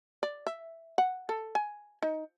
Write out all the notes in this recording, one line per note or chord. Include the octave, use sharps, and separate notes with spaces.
D5
E5
F#5
A4
G#5
D#4